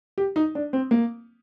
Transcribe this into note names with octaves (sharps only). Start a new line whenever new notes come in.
G4
D#4
D4
C4
A#3